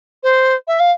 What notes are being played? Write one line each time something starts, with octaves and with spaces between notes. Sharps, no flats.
C5
E5
F5